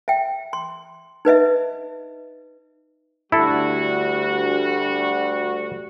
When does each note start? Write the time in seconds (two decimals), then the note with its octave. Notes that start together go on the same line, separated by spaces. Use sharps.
0.08 E5 G5
0.53 C6
1.25 D#4 B4 D#5 E5
3.32 D2 G3 E4 F#4 A4